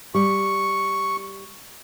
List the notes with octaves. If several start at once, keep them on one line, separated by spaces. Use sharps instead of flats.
G3 C#6